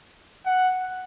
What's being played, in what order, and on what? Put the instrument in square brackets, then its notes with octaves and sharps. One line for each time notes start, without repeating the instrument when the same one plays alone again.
[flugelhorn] F#5